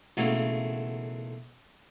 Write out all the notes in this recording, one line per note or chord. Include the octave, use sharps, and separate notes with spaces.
B1 C#3 E3 F#3 A3 A#3